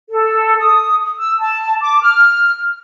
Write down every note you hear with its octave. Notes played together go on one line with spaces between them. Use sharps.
A4
D#6
E6
A5
D6
F6